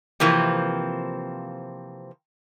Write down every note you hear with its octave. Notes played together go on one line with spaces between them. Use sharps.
C3 E3 F3 A#3 C4